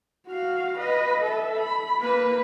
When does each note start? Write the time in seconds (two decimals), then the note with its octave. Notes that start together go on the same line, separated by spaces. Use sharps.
0.27 F#4 F5
0.78 B4 D#5
1.23 A4 E5
1.60 B5
2.00 A#3 B4